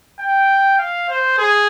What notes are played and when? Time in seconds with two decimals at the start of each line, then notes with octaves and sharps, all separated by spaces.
0.19 G5
0.78 F5
1.09 C5
1.38 G#4